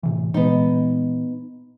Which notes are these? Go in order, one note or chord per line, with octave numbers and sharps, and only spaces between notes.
A2 C3 E3
A#2 E3 G#3 B3 D#4